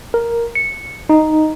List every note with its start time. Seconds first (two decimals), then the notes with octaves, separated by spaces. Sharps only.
0.14 A#4
0.55 C#7
1.09 D#4